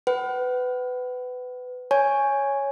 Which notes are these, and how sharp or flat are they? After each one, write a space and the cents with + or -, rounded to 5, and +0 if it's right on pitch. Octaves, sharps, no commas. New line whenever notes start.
B4 +20 F#5 +35
C#5 +0 G#5 +0